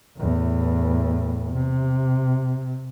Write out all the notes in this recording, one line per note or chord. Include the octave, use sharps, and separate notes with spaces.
E2 A2
C3